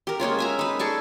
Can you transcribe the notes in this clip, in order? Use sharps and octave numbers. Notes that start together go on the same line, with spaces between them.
G4 A#4
G#3 A#3 C#4 F4
E5 G#5 A#5
D#4 B4
G#4 A4 D5 C#6